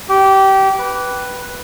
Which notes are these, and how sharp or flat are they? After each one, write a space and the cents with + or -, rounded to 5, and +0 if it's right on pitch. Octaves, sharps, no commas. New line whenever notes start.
G4 -20
B4 +0